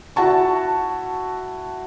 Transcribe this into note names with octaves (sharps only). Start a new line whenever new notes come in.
E4 F#4 F#5 A5 C#6